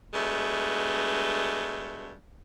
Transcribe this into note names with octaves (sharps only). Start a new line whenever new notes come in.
G2 B2 G#3 A3